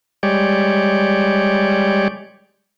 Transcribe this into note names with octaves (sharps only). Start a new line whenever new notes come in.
G3 G#3 G4 C#5 D5